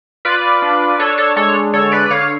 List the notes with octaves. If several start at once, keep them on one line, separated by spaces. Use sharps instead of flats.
F4 B4 D5
D4
D4 A4 C#5
A4 C#5
G#3 A4 C#5
D3 A4 C#5
B4 D5
D3 C#5 F5